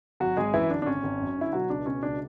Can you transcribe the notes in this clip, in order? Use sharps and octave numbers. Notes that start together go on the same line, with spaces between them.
G#1 F#3 F#4
G#1 G#3 G#4
F#2 E3 E4
D3 D4
D4
G#1 C#4
G#1
F#2
D3 E4
B2 F#3 F#4
C#2 D4
B2 C#4
C#2 D4